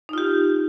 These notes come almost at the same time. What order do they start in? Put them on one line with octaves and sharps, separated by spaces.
D#4 F4 G4